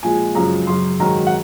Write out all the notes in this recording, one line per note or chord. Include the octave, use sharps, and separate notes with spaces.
A#2 F3 G#3 G#5
F#2 C#3 F3 G#3 A#5
F#2 C#3 F#3 C6
G#2 D#3 F#3 A#5
F#5